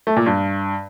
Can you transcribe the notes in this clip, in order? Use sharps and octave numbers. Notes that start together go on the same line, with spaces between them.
A3
A#2
G2